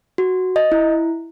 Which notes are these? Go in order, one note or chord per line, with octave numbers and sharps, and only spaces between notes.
F#4
D#5
E4